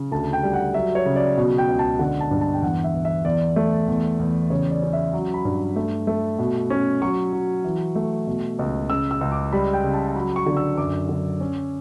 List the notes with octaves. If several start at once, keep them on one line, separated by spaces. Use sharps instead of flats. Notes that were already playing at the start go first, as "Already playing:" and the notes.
Already playing: C#3
D2 A5
G5
G3
F#5
F#3 E5
C#5
C#3
D5
B2
G5
C#2
A5
D3 F#5
A5
G2
A5
G5
E2 F#5
E5
E2
E5
E2 D5
A3
E2
E2
C#3 C#5
D5
C#4
E5
F#3
B5
G2
A3
A3
B2
C#4
F#3 C#6
F#3
E3
A3
B2
C#2
C#3 E6
E6
C#2
D6
G3 B5
G5
C#3
A5
F#3 B5
C#6
D3
E6
F#2 D6
D3
C#4